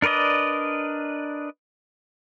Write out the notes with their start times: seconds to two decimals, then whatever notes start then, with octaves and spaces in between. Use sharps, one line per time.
0.02 D4 A#4 B4 D5 D#5